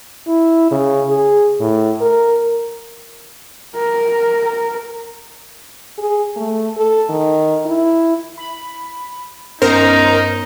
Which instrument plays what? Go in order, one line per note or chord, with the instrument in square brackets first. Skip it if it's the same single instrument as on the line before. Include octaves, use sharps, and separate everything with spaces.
[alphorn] E4
C#3
G#4
A2
A#4
[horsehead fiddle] A#4
A#4
[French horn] G#4
A3
A4
D#3
E4
[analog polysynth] B5
[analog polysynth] G2 B3 C#4 [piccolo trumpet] D#4 [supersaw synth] A#4 C5 A#5